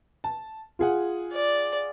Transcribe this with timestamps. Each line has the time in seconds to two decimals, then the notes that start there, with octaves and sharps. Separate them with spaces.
0.24 A5
0.79 F4 G#4 F#5
1.33 D5